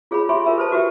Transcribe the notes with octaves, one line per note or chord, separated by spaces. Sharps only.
F4 G#4 C#5 F#5 B5
G4 C#5 E5 G#5 B5 C6
F4 A#4 E5 B5
A4 B4 C5 A5
F#4 G4 B4 E5 G5